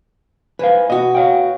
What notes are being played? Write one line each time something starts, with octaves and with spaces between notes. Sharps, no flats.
E3 B4 C5 F5
B2 F#4 D#5
C#5 F5 G5